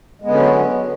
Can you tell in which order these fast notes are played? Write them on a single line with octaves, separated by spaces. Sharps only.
G#3 B3 D3 C#4 F#3